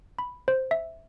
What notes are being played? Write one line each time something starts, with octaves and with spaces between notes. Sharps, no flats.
B5
C5
E5